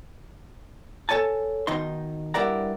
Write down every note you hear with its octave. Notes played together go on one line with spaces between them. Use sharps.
A4 B4 C#5 G#5 A5
B2 D#3 D#4 C6
G2 E4 A#4 D5 F#5 A#5